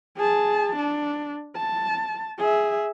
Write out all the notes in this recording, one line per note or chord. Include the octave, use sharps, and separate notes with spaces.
G#4 A5
D4
A5
G#4 E5